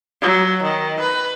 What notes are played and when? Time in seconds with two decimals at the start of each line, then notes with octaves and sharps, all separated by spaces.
0.22 F#3
0.63 D#3
1.00 B4